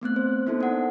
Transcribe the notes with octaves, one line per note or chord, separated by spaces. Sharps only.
A3 B3 C4 F#6
C5
A#3 B3 D#4 E4 A4 C5
D4 F#5